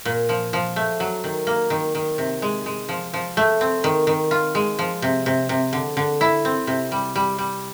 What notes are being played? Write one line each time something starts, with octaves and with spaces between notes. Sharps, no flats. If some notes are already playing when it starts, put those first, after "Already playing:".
A#2
F3
F3
A3
F#3
D#3
A#3
D#3
D#3
C3
G#3
G#3
F3
F3
A3
C4
D#3
D#3
F4
G#3
F3
C3
C3
C3
D3
D3
E4
C4
C3
G3
G3
G3